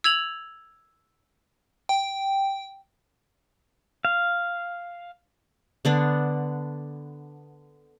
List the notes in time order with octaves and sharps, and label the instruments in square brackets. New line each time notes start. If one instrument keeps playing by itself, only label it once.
[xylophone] E6 G#6 F7 F#7
[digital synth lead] G5
[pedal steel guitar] F5
[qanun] D3 B3 D4